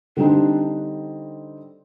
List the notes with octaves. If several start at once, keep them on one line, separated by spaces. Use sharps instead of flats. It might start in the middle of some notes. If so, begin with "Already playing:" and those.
D3 G3 C4 D4 D#4